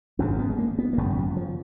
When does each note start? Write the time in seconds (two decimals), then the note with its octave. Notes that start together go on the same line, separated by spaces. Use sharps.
0.19 G#1 F#2 C#3 C#4
0.39 B3
0.50 G#3
0.58 A#3
0.78 B3
0.93 A#3
0.98 G#1 F#2 C#3 B3
1.10 D#3
1.17 F3
1.36 F3